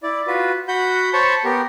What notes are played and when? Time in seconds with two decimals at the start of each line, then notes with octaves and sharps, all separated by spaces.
0.03 E4 D5
0.27 F4 F#4 B4
0.68 F#4 F#5 B5 G6
1.13 C5 C#5 A5 B5 C#6
1.44 B3 G4 A#4